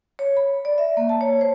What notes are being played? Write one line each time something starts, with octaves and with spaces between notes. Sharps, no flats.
C#5
B5
D5
E5
A#3
A5
C#5
C5